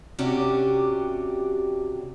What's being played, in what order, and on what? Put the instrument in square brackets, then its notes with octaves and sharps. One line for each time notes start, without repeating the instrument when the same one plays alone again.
[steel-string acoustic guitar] C3 C#4 D4 F#4 G4